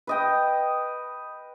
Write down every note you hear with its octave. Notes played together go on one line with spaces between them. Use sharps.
B4 D#5 G5